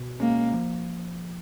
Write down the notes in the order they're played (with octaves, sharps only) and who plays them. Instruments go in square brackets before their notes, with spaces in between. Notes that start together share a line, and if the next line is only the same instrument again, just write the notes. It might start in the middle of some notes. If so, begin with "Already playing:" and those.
Already playing: [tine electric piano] B2
[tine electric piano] G#3 C#4 [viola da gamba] A#3
[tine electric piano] F3